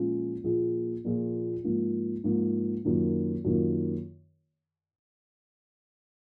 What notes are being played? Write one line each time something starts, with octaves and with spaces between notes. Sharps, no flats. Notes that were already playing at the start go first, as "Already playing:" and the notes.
Already playing: A#2 F3 G#3 C#4 F4
A#2 F3 A#3 F4 G#4
A#2 F3 A#3 F4 G#4
G#2 F3 A#3
G#2 F3 A#3
F#2 D#3 A#3 F4
F#2 D#3 A#3 F4